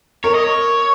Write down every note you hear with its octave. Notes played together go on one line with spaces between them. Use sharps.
A#4 C#5
D#5
C#5